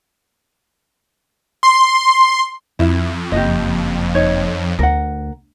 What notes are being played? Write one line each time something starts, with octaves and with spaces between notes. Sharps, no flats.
C6
F2 E4 E5
F#1 G4 D#5
D#4 C#5
D2 A#4 F#5